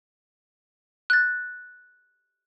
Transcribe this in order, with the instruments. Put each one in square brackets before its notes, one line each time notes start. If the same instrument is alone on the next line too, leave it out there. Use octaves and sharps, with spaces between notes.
[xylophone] F#6 A6